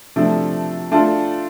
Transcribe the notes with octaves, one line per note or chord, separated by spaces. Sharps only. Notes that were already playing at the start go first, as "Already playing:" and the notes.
C3 F3 A3 D4 A4
A3 D4 F4 A4